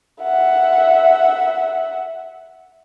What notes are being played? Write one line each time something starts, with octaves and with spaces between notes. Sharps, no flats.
E5 F#5